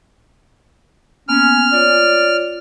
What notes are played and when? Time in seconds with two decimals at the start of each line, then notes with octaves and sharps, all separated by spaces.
1.29 A#3 B3 C#4 G#5 F6
1.73 F4 C#5 D5